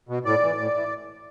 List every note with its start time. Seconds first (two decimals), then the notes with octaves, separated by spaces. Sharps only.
0.09 B2
0.25 A2 D5
0.42 E3
0.58 A2
0.74 E3